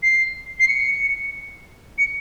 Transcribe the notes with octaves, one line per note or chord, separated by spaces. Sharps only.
C7
C7
C#7
C#7